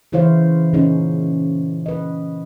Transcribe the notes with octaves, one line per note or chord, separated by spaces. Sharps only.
C#3 E3 E4 C5 C#5 F5
A#2 C#3 C#4 D#4
B4 D#5